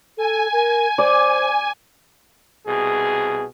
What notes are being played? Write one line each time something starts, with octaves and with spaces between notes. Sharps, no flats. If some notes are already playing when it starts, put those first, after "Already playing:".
A4 G#5
A#4
C5 D5
C2 B2 G#4